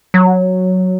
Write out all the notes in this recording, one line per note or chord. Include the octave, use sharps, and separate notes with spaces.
F#3